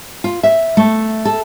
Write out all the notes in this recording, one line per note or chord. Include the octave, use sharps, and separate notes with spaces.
F4
E5
A3
A4